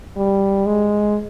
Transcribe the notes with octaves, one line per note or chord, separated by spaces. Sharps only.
G3
G#3